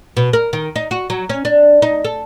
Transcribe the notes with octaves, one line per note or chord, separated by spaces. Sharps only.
B2
A#4
D#3
D#4
F#4
F#3
C#4
D4
D#4
A4